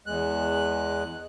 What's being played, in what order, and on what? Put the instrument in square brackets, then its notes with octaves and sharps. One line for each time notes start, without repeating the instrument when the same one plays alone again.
[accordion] E2 G#3 F#6